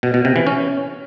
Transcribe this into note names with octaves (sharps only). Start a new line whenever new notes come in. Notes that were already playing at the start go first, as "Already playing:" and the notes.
B2
B2
C3
E3
C#4